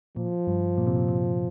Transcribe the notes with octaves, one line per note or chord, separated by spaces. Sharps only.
A#2 F3
G2
A#2
C3
A#2
C3